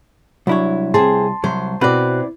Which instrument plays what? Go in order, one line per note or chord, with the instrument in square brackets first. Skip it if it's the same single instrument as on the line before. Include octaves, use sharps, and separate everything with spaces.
[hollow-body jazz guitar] C2 E4 C#5 [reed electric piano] F#3 D4
[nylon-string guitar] C4 G#4 [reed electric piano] A5 C6
[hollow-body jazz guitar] C2 F#3 [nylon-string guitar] C5
[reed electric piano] B2 F#4 F#6 [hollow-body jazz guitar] C4 B4 [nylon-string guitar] E4 D5